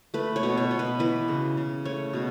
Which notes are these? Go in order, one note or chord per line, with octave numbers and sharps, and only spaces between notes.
A3 B4
C#5
B2
C#5
B2
B4
E3 B4
C#3
C#3
A3 C#5
B2